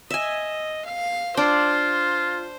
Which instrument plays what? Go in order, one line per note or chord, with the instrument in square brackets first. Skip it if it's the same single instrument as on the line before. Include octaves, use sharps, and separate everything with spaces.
[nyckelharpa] D#5 [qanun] E5 G#5
[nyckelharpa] F5
[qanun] D4 [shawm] F4 [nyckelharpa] C5